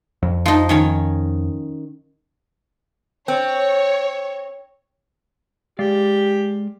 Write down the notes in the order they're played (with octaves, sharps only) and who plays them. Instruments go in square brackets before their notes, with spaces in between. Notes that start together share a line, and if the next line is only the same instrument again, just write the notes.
[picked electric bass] F2
[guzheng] F3 D#4
D#3 C#4 C#5
[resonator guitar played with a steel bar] C4 [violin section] C#5
[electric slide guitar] G#3 D5 F5 [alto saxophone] G4